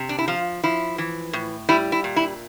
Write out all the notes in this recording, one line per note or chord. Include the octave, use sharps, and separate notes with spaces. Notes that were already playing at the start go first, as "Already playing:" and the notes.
Already playing: C3
D4
E4
F3 F4
F3 E4
E3
A2
G3 E4
E4
A#2
E4